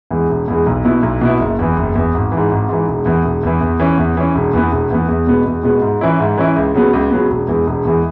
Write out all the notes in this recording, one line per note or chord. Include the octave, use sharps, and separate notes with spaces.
E2 E3 G#3
E1
E2 E3 G#3
B1
B2 B3 E4
B1
B2 B3 E4
F#1
E2 E3
F#1
E2 E3
G#1
E3
G#2
G#1
G#2 E3
E1
E2 E3
E1
E2 E3
E2
E3 C#4
E2
E3 C#4
E1
E2 E3 B3
E1
E2 E3 B3
E2
B2 G#3 B3
E2
B2 G#3 B3
G#2
E3 C#4 E4
G#2
E3 C#4 E4
C#2
C#3 F#3 B3
C#2
C#3 F#3 B3
E1
E2 E3 G#3
E1
E2 E3 G#3